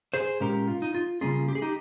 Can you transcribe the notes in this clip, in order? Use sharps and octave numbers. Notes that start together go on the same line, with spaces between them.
G#4 C5
A#2 G#3 C#4 G4 A#4
F4
D#4
F4
C#3 G3 A#3 C#4 F4 G#4
G4
G#4
D#4 G4